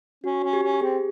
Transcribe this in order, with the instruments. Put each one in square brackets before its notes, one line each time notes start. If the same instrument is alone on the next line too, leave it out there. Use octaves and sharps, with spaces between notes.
[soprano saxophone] C#4 [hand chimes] F#4
[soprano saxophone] C#4
[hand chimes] G4
[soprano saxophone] C#4
[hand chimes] G4
[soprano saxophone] C4 [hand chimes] G#4